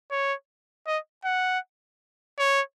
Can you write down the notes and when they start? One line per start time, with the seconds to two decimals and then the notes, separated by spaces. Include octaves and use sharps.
0.11 C#5
0.87 D#5
1.25 F#5
2.38 C#5